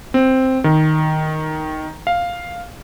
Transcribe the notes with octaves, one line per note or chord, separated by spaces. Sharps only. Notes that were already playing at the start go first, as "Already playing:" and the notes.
C4
D#3
F5